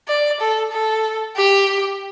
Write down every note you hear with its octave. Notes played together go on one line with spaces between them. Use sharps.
D5
A4
A4
G4